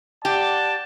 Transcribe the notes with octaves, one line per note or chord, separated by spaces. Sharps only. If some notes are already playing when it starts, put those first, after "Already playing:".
G4 D5 F#5 A5